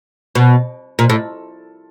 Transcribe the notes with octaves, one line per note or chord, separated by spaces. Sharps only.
B2
A#2
A2